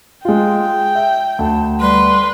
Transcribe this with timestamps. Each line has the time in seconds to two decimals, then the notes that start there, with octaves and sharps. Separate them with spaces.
0.25 G#3 F4 G5
0.95 E5
1.39 D2 A5
1.81 G3 B4 C6